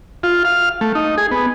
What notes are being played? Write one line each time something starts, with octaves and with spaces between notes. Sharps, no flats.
F4
F5
A3
D#4
G#4
B3